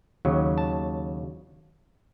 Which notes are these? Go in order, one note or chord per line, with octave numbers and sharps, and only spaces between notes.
D#2 C#3 F#3
A5